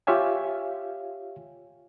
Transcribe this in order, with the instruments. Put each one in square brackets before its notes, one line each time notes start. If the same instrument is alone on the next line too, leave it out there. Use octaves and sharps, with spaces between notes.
[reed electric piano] F4 G4 C#5 E5 F5 G#5